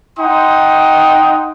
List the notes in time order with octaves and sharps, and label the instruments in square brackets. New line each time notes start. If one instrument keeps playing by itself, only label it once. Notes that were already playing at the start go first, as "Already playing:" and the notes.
[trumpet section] D#4 F#5 G5 C6 D#6